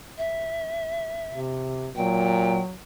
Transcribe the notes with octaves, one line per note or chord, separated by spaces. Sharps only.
E5
C3
A#2 F#3 G5